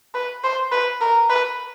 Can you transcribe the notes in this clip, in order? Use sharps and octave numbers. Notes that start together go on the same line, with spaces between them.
B4
C5
B4
A#4
B4